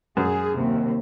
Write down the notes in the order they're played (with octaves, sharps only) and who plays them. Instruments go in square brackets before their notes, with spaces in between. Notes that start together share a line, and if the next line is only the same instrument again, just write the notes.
[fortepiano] F#2 [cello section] G#4
[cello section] D#2 C3